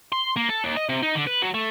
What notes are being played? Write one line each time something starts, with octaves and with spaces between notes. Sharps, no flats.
C6
A#3
A4
D#2
D#5
C3
D#4
D3
B4
F#3
A3